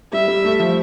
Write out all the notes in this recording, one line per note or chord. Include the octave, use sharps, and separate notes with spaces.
G3 E5
G3
A3
F3